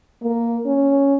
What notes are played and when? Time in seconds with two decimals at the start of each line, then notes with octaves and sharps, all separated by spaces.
0.22 A#3
0.66 C#4